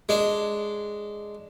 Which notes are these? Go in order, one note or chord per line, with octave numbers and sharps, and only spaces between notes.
G#3 D4